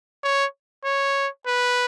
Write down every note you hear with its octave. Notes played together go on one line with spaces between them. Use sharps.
C#5
C#5
B4